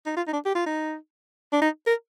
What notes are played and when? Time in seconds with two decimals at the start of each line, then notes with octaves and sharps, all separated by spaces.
0.06 D#4
0.17 F4
0.27 D#4
0.33 D4
0.45 G4
0.55 F4
0.66 D#4
1.53 D4
1.62 D#4
1.87 A#4